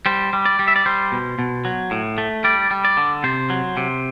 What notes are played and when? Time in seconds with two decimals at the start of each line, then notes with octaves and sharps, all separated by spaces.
0.06 G3 C5
0.33 G3
0.45 D5
0.59 G3
0.68 E5
0.76 D5
0.86 G3 C5
1.12 B2
1.39 B2
1.65 F#3
1.91 A2
2.18 A3
2.44 G3 D5
2.71 G3
2.85 D5
2.97 D3
3.24 C3 C5
3.50 F#3
3.77 C3